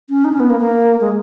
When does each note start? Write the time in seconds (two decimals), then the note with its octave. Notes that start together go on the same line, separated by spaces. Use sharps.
0.10 C#4
0.25 D#4
0.33 C#4
0.40 B3
0.50 A#3
0.60 A#3
1.01 G#3